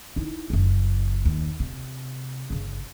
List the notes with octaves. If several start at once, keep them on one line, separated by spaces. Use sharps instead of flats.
D#4 E4
F#1 C#4
D#2
C3
G1 C#3